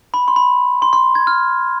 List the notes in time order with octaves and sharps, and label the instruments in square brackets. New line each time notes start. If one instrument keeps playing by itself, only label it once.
[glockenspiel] B5
C6
B5
C6
C6
G#6
F6